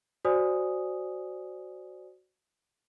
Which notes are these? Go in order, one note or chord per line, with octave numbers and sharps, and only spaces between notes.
F#4 C5 D5 G#5 D#6